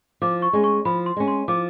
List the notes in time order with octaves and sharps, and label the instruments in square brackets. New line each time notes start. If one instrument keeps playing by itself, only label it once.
[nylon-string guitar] F3 [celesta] D6
[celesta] C#6
[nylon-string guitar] G#3 C#4
[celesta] C#6
[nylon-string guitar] F3 [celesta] B5
[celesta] C6
[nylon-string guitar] G#3 C#4
[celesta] C6
[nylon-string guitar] F3 [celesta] D6